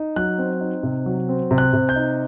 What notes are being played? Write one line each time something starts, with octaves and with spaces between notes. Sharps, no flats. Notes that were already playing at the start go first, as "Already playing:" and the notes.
Already playing: D#4
F#3 F#6
C4
D#4
C3
F#3
C4
C3
F#6
C3
G6
D#4